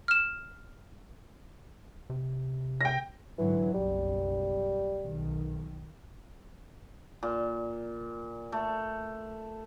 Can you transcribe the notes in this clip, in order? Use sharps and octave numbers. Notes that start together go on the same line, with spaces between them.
F6 E7
C3
G5 A#6
G#2 D3 E3 F#3
F#1 B1 F#2 G3
B1 D#3
A#2
A3